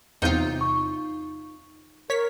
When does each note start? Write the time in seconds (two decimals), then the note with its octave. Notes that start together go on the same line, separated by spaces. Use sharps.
0.22 E2 C3 D#4 F4 G6
0.61 C#6
2.10 A#4 C#5 B6